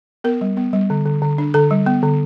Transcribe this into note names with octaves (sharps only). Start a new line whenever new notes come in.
B3 A#4
G3
B3
G3
D3
D3
D3
D4
D3 A4
G3
B3
D3